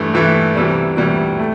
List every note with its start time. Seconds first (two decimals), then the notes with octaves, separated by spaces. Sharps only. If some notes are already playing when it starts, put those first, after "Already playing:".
Already playing: G2 E3 A3
0.13 G2 E3 A3
0.55 D2 C3 E3 G3
0.97 D2 C3 E3 G3
1.39 A3